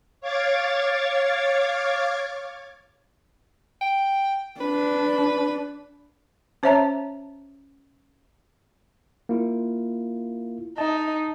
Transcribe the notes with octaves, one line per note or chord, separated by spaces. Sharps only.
C#5 F5 D6 G#6 A6
G5
D4 B4
C#4 C5 C#5 E5 A5 A#5
A#3 E4 F4
D#4 A5